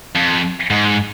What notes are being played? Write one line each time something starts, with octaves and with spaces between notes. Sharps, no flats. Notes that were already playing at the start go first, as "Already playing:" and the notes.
F2
G#2